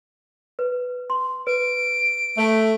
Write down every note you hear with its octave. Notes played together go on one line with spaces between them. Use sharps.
B4
C6
B4 D7
A3